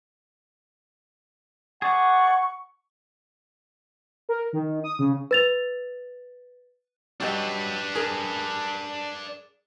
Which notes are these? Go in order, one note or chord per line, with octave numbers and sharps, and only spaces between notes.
G#4 D5 F#5 C#6
A#4
D#3
D#6
C#3
B4 A6 F7
F#3 G3 D4 B4 D#5
G#4 A#4